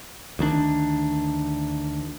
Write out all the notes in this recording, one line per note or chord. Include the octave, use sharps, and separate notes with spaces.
D2 D#3 A#3 D4